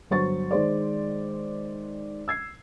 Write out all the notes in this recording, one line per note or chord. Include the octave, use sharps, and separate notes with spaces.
G1 F#3 C5 C#6 A6
D#3 G#3 C5 D5
E6 G#6 C7